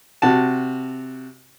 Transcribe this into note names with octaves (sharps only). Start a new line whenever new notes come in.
C3 F#4 A5